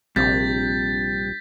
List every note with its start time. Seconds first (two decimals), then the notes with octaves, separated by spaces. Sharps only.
0.16 A#1 G2 C3 G6 A6 B6